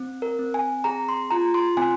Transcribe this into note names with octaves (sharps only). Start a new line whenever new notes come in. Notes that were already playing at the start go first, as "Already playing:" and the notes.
Already playing: C4
A#4
C4
G#5
G#4 A#5
C6
F4 A#5
C6
C4 G#5